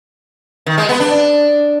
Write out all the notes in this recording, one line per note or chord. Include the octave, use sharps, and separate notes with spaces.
D#3
G#3
B3
D4